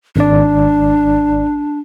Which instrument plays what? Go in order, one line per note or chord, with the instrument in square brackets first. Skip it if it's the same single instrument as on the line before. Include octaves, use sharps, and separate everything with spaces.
[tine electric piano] G#1 D5 [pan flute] D4